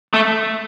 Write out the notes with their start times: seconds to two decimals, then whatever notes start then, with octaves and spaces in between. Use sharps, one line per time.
0.14 A3